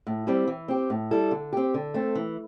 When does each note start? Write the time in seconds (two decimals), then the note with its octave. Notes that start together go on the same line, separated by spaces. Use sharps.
0.07 A2
0.27 G3 C4 E4 G4
0.47 E3
0.68 C4 G4
0.90 A2
1.11 G3 E4 A4
1.31 D3
1.53 C4 G4
1.74 D3
1.94 A3 C4 A4
2.15 E3